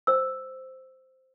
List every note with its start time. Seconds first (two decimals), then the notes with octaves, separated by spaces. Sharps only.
0.07 C5 E6